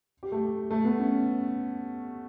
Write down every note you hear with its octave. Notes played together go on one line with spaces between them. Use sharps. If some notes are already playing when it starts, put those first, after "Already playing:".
G4
A3
A3
B3
C#4